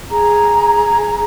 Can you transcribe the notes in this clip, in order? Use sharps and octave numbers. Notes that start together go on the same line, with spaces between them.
G#4 A#5